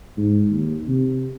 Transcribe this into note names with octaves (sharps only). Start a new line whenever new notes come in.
G#2
D#2
C3